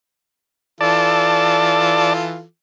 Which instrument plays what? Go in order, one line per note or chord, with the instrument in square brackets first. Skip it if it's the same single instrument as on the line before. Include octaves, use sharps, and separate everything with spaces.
[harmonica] E3 F4 A4 [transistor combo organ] D5 A5